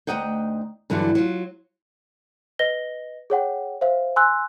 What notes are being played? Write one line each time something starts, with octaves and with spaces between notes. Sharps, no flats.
D2 G#2 D#4 D#5 F#5 G5
G2 D3 E3 F#3 G3
F#3 F4
B4 D#5 A#6 G7
G#4 C#5 F#5 G5
C5 E5 F5
G#5 C6 E6 F#6